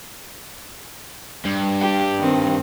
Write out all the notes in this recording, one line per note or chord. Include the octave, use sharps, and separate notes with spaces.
G2
G4
D#3 C4